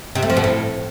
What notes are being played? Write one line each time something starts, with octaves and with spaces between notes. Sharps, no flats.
C3
A3
F3
B2
A2